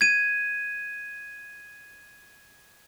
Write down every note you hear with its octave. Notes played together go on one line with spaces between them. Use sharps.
G#6 D#7